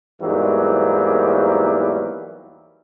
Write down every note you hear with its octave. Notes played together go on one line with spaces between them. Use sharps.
E2 G#2 E3 F#3 G3 A#3